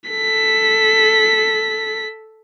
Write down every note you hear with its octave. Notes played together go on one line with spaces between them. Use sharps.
A4 B6